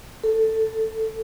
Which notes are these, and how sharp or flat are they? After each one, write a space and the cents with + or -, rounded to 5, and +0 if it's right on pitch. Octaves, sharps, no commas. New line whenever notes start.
A4 +10